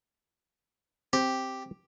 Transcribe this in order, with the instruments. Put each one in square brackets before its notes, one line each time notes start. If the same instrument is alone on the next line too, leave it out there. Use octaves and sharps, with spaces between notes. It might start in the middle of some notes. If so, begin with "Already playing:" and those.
[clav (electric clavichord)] C4 [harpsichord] G4